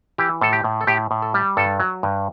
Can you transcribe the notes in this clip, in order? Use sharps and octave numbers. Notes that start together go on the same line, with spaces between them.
E3 G4
A2 A4
G4
A2
A4
A2 G4
A2
A4
G3
G2 A4
F#3
G2